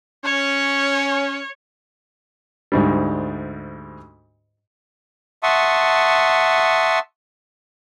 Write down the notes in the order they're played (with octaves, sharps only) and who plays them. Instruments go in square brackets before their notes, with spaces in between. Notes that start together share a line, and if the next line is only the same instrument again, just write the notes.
[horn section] C#4 [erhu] C#5
[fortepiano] D2 G#2 G3
[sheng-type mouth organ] E5 F#5 A5 C6 C#6 D#6